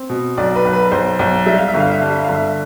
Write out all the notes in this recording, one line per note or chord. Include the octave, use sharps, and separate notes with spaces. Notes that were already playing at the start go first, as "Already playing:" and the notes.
Already playing: C4
B2
B1 D5
B4
B1
B4
B1 C5
B1
G3 E5
F5
E5
G1
F5
E5
G2 F5
E5
G1 F5
E5